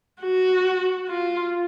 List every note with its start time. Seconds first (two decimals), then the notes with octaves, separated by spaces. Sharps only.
0.22 F#4
1.09 F4